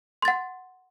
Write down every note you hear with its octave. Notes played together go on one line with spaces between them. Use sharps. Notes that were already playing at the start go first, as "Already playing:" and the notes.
F#5 C6 A6